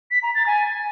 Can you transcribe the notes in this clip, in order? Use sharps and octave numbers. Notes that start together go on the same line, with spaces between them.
B6
A#5
A6
G#5